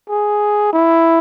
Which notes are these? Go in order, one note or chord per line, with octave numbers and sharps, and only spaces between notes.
G#4
E4